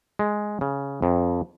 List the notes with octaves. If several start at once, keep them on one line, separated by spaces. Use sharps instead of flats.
G#3
C#3
F2